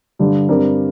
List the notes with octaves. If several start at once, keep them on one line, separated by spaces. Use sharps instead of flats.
G2 D3 G3
G2 G3 C4 A#4